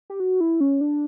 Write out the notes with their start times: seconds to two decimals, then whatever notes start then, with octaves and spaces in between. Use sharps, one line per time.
0.10 G4
0.20 F#4
0.40 E4
0.60 C#4
0.81 D4